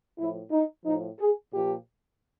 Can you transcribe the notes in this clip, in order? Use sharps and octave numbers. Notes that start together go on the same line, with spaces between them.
A2 F3 E4
D#4
A2 F3 D#4
G#4
A#2 F3 G4